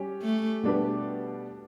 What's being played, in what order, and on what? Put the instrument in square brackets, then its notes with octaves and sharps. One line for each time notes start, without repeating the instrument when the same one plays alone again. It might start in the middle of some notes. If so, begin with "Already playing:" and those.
Already playing: [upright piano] G3 C#4 G4
[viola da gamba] A3
[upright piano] B2 G3 D4 G4 B4